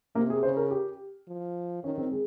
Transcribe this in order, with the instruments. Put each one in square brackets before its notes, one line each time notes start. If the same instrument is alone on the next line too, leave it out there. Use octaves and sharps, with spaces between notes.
[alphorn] C3 [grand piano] A#3
[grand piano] G#4
[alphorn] C#3 [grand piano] C5
[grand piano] A#4
G4
[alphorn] F3
[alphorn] D#3 [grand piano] C#4
[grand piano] C4
G#3